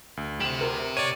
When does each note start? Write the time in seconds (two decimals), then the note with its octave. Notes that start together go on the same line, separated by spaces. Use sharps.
0.17 D2
0.41 G4 C5 E7 F#7
0.61 A#4
0.97 C#5 D5 D#7